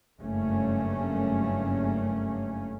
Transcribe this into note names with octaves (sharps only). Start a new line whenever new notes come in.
F#1 G2 A3 A#3 C#4